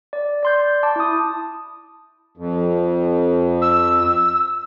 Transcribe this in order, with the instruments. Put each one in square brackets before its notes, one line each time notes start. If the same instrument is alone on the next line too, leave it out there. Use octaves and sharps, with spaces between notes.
[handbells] D5
D5 C6 G6
A5 D6
E4 D#6
[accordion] F2
[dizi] E6